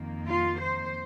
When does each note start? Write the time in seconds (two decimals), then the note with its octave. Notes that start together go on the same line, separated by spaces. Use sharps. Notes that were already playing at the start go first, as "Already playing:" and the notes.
Already playing: F2 D#3 A#3
0.28 F4
0.60 C5